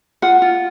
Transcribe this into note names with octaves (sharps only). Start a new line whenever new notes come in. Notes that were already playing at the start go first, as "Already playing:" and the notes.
F4 F#5
F4